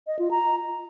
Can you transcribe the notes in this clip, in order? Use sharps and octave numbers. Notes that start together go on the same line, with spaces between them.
D#5
F4
A#5